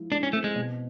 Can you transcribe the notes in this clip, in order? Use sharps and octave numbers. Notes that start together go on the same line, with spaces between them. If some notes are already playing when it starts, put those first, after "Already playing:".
Already playing: F3 G#3 E4
G#3 D4
C#4
A3 C4
G#3
B2